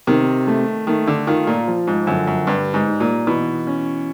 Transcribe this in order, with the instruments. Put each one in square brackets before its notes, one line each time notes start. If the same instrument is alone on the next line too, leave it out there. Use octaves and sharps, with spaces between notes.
[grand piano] C3 [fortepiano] D#3
[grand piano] A3
[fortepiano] D#3 [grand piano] A3
[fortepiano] D3
[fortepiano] D#3 [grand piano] F4
[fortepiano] A#2
[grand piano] F3
[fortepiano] G#2
[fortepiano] F#2 [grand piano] D3
[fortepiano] F#2
[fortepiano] G2 [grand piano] G3
[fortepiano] G#2
[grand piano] D#4
[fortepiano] A#2
[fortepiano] B2 [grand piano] E3
[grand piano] C#4